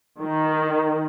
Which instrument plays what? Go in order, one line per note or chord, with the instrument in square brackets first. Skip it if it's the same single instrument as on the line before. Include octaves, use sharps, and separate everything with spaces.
[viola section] D#3